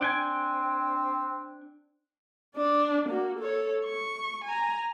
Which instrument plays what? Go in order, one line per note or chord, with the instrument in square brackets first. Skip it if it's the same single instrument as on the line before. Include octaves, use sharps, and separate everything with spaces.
[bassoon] C4 [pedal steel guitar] D4 G5 G#5
[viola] D4 D5
A#3 F#4
A4 C#5
C#6
G#5 A#5